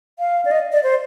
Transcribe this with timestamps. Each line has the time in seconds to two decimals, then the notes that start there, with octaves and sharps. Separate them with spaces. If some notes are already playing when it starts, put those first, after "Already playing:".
0.19 F5
0.45 D5
0.51 D#5
0.73 D5
0.83 C5